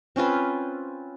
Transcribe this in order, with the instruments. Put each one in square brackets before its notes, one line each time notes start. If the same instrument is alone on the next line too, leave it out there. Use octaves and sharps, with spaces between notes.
[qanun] C4 C#4 F4 B4